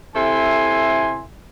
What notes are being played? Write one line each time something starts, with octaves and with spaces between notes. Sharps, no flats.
C3 E4 A4 E5 G#5 C6